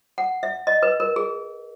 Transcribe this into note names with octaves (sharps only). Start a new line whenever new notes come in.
F#5
E5
D#5
B4
A#4
G#4